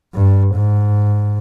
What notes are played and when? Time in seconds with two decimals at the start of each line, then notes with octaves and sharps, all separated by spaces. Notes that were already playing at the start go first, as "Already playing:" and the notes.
0.15 G2
0.55 G#2